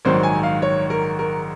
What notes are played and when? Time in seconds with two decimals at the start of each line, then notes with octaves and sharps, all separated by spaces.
0.05 A#1 G#2 D#3 F#3 C5
0.23 G#5
0.43 F5
0.62 C#5
0.90 A#4
1.19 A#4